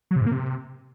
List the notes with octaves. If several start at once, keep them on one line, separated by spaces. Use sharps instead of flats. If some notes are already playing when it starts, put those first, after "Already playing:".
F#3
C3
G#2
A#3
C3